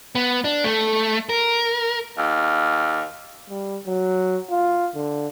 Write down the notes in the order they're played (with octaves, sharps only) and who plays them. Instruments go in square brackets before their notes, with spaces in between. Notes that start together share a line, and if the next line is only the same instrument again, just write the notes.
[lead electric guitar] B3
D4
A3
A#4
[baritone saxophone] D#2
[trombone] G3
F#3
F4
D3